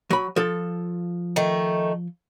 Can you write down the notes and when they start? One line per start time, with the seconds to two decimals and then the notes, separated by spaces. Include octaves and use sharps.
0.10 F#3 B5
0.36 F3 A4
1.36 D#3 A3